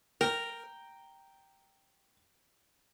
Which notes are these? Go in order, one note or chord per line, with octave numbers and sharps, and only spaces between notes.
A#4 G5 A#5